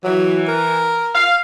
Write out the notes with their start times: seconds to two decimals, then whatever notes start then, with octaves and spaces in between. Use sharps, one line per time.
0.04 E3 F#3
0.48 A#4
1.14 F5